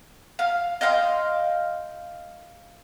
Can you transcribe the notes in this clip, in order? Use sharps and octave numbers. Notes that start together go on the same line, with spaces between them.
F5
D#5 F5 G5 C6